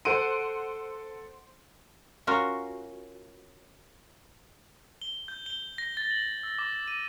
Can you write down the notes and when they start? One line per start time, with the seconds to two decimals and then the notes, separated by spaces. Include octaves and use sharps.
0.05 A4 C5 F#5 C6 D7 D#7
2.27 C#4 F4 F#4 A#4
5.02 G7
5.28 G6
5.46 G7
5.78 A#6
5.97 A6
6.11 F#7
6.43 E6
6.59 D6
6.88 D#7